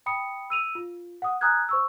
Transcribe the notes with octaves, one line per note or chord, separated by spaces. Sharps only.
G5 B5 D#6 C#7
E6 D#7 F7
F4
F#5 D#6
G#5 A#5 D#6 F6 F#6 G#6
C5 C#6 E6